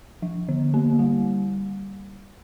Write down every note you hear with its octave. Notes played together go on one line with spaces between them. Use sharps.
F3
D3
A#3
G3